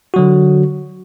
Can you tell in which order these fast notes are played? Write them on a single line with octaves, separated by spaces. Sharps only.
F#4 F#3 D3